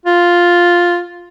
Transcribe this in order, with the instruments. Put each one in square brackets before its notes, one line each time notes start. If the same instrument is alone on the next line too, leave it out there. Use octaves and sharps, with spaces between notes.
[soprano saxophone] F4